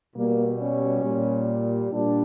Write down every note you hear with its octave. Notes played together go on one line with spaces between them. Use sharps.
B2 G3 A#3
C#4
A#2 G3
A#2 G3 D4